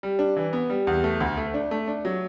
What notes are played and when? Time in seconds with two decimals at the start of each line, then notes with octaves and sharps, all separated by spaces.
0.03 G3
0.19 D4
0.36 E3
0.53 B3
0.70 G3
0.87 E2
1.04 A3
1.20 D2
1.37 A3
1.54 D4
1.71 A3
1.88 D4
2.05 F#3